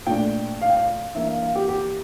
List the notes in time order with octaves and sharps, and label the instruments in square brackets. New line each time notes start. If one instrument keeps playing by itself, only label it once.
[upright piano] A#2 A3 D4 G5
F5
G5
F5
E3 A#3 D4 E5
F5
F5
G4
G4